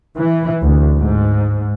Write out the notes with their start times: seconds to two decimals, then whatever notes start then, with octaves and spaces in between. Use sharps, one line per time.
0.17 E3
0.63 D2
0.98 G#2